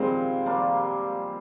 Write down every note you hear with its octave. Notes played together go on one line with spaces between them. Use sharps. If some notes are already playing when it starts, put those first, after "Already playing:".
Already playing: A#2 G3 G#3 A#3 C4 D#4 F4 G4
G3 A#3 D4 F4